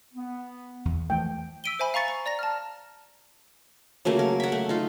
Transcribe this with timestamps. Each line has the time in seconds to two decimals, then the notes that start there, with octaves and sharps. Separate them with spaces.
0.14 B3
0.85 E2
1.10 E3 F3 A3 G5
1.64 E6 B6 D7 D#7 G7
1.79 C5 E5 G#5 B5
1.94 F5 A#5 C#6 A6 C#7
2.08 A#5
2.26 D5 A#5 A#6
2.39 A5 F6
4.05 C#3 F#3 A3 A#3
4.19 A#4
4.40 E5 F#5
4.52 A3
4.69 D#4 F4